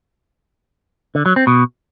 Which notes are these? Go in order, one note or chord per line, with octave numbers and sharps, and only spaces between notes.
D3
F#3
C4
B2